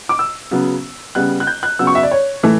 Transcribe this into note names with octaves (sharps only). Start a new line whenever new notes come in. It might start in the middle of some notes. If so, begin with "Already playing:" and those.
D6
E6
C#3 F#3 B3
C#3 G3 B3 F#6
F#6
G6
F#6
C#3 F#3 B3 E6
C#6
E5
D5
C#5
A2 E3 A3